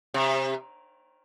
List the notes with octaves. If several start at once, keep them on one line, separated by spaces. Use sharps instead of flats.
C3